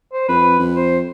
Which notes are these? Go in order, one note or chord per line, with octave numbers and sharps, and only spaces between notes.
C5
F2 B4
F2
C5